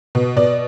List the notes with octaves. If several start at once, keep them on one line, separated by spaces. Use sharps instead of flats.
B2
B2 D5